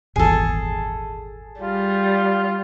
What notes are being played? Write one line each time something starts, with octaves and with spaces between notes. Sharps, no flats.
D#1 G#1 E2 G#4 A4
G3 F4